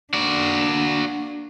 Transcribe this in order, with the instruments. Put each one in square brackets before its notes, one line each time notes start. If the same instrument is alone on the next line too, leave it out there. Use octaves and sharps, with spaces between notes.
[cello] A#3 D4 [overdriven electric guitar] F#4 D5